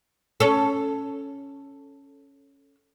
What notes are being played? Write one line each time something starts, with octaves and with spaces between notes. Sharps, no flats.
C#4 A4